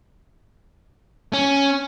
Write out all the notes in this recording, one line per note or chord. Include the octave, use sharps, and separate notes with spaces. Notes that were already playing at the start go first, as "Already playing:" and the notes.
C#4